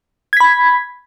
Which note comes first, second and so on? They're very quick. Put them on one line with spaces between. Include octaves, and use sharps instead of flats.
G#6 B6 B5